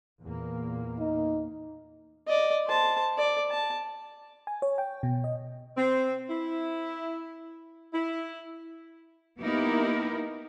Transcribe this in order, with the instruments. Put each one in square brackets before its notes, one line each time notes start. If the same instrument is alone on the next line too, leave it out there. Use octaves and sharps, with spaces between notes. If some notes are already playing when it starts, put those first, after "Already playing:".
[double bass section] E2 A#2 A#3
[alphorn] D#4
[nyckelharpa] D5 D#5
C5 A5
D5
A5
[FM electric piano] G#5
C#5
G5
B2
D#5
[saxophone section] C4
E4
E4
[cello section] A#3 B3 D#4 E4 G4 A#4